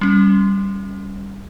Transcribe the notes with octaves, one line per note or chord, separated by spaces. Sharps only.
G3 C#4